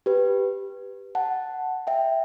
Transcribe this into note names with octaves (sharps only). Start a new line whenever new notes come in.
G4 B4
F#5 A5
E5 G5